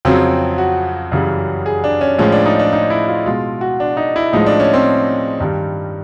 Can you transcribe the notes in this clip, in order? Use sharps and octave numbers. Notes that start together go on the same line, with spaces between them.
F2 C#3 F#3 C4
F#4
F#2 C#3 E3 G3
G#4
D4
C#4
A2 F3 G#3 C#4
D4
D#4
D4
D#4
E4
F4
B2 G#3 F4
F#4
D4
D#4
E4
A2 F3 G#3 D#4
D4
C#4
C4
G2 D#3 G3